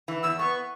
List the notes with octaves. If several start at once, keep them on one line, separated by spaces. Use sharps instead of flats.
E3
E2 E6
B3 C#6